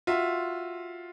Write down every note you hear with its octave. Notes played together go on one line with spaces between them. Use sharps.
F4 F#4 E5